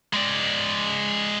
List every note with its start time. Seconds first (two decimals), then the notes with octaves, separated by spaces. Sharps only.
0.13 G#3 D5